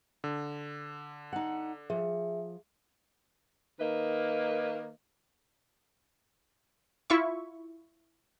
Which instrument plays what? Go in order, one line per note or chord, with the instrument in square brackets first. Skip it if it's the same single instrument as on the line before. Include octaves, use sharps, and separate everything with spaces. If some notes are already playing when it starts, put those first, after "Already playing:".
[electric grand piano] D3
[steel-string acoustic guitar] D#4 F#5
[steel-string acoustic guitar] F3 [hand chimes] G#4 E5
[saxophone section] D#3 A#3 B4 D#5
[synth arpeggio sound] E4 F4 E5 C#6